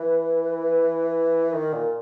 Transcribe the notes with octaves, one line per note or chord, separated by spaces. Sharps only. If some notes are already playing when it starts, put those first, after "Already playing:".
Already playing: E3 B4
B4
D#3 A#4
A#2